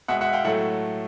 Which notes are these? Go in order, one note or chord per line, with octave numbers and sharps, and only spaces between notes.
B2 G#3 E5 F#5
E5 F#5
F5 G5
A2 F#3 A3 E5 F#5